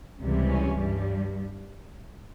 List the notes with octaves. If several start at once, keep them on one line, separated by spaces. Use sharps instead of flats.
C#2 C3 E3 G3
C#4
G2 G3